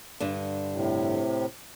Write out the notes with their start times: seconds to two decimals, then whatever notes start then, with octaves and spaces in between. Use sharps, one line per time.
0.20 G2 D3 D4
0.72 A2 C3